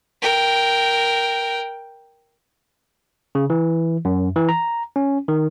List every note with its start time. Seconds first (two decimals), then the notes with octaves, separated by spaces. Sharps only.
0.22 A#4 G5
3.35 C#3
3.50 E3
4.05 F#2
4.36 E3
4.49 A#5
4.96 C#4
5.28 D#3